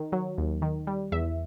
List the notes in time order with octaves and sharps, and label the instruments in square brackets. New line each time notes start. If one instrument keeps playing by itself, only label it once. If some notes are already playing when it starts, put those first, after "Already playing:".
Already playing: [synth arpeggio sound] D#3
F#3
D#2
D#3
G3
E2 E5